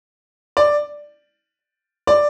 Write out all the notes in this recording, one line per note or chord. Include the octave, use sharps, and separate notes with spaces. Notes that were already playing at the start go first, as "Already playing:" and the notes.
D5
D5